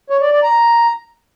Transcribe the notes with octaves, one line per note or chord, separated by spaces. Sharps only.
C#5
D5
D5
A#5